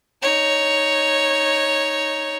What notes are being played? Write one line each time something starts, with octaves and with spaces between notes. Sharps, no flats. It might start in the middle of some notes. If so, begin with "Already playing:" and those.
D#4 C#5